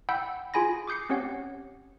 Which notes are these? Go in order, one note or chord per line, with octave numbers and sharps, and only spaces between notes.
F#5 G5 B5 E6 G6
F4 G#4 G#5 B5 A#6
D6 D#6 G6 C7 C#7
C4 C#4 G4 C#5 F#5